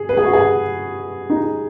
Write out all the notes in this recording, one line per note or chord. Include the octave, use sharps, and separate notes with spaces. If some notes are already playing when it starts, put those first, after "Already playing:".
Already playing: G#4
B4
G#4
F#4
G#4
D#4